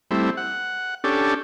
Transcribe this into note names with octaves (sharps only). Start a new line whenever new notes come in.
G3 A3 C4 E4
F#5
C#4 D4 G4 A4